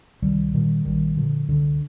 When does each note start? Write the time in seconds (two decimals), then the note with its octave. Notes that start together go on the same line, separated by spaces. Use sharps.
0.22 C2 D#3 G3
0.54 A#2 D#3 G3
0.85 A#1 D#3 G3
1.17 A#2 D3 F3
1.48 C2 D3